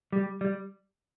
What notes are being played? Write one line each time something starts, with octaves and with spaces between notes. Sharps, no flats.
G3
G3